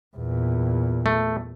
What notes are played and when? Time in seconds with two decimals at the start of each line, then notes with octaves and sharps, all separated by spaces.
0.17 E2 A#2
1.06 A3